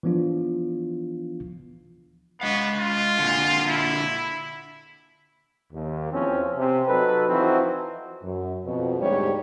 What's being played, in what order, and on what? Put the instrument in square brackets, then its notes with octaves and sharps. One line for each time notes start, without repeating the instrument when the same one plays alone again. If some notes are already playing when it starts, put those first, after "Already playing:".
[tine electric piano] E3 F3 B3 D4 F4
[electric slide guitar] G#3 F5 [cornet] B3
[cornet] F4
[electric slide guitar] A#2 D3
[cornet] E4
[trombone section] D#2
E2 F3 C4 C#4
C3
F#3 D#4 A4 B4
E3 F3 C4 D#4 F#4
[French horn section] F#2
F2 B2
D2 G#2 G3 G4 C#5